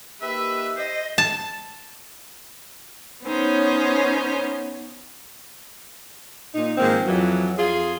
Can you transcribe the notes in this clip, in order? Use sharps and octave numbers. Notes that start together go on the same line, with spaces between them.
A#3 D#4 G4 B4 E5
C5 D#5
A5
B3 C#4 D#4 C5 C#5
A#2 D#4
G#2 D#3 F3 A#3 C4
F2 E3 F#3
F2 F4 G#4